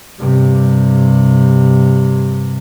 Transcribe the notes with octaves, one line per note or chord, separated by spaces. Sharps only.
G2 C3